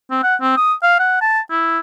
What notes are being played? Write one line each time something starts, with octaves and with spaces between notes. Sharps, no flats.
C4
F#5
C4
D#6
F5
F#5
A5
E4